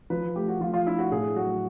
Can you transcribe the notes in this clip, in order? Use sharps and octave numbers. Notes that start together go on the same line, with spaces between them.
F3 B4
A3 G4
F#4
F3 F4
F4
D4 E4
F#4
A2 G#4
F#3 F#4